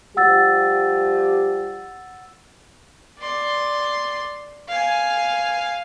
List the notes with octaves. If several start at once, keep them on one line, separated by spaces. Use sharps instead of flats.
F3 G3 G4 F#5 E6 A6
D5 C6
F5 G#5